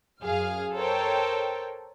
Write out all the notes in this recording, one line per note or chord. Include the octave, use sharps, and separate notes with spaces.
F#2 G#4 F5 F6
A4 A#4 C5 C#5 G5